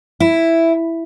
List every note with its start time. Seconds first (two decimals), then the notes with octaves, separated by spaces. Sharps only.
0.20 E4